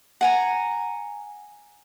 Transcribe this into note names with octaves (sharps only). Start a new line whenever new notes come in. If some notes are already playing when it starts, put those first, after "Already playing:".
F#5 G#5 A#5